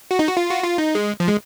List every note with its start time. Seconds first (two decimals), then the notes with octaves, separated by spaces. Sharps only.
0.11 F#4
0.19 D#4
0.27 F#4
0.37 F4
0.50 F#4
0.64 F4
0.78 D#4
0.95 G#3
1.20 F3
1.28 G#3